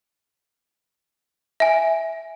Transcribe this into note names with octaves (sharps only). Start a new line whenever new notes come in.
E5 G#5